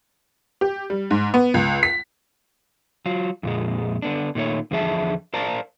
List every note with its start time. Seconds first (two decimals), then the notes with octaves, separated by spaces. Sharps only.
0.61 G4
0.90 G3
1.11 G#2
1.34 B3
1.54 C#2
1.83 B6
3.06 F#3 F4
3.43 F2 A#2 G#3
4.02 D3 B3 D4
4.35 A#2 D#3 A3 C#5
4.71 E2 D3 F3 G#4 E5 A5
5.34 A#4 C5 D5 F5 A5 A#5